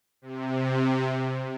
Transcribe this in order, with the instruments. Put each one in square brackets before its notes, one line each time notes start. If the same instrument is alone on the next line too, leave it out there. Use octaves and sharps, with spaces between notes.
[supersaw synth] C3